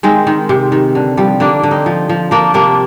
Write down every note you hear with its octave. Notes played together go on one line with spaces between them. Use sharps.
D#3 G#3 C4
D#3
C3
D#3
D3
F3 G3
D3 A#3 D4
D3
C4 D#4
F3
F3
F3 A#3 D4
C3 A#3 D4